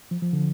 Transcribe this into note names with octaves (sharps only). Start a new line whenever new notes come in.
F3
F3
D3